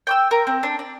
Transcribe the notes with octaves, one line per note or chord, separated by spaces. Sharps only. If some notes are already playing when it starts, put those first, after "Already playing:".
G5 D6 E6
A#4
C4
D4
D5